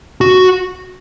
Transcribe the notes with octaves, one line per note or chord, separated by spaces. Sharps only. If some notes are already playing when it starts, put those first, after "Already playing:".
F#4